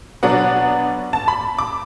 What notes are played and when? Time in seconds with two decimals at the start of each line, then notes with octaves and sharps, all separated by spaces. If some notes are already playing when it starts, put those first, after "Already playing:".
0.23 B2 F#3 B3 D4 F#5
1.13 A5
1.28 B5
1.58 D6